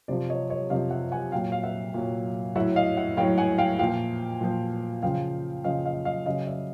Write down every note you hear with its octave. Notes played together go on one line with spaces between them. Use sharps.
C3 F3 C5 D5
C#5 D#5
C#5 D#5
C3 F3 D#5 F5
E5 F#5
F#5 G#5
A#2 F#3 F5 G5
F5
E5 F#5
A#2 F#3
A2 F#3 E5 F#5
D#5 F5
E5 F#5
A2 F#3 F5 G5
F#5 G#5
F5 G5
A#2 F3 F5 G5
A#2 F3
C#3 F3 F5 G5
C#3 F3 D#5 F5
D#5 F5
D#5 F5
C#3 F#3 D#5 F5
D5 E5